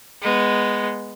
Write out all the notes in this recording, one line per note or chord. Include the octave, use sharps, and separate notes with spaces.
G#3 B3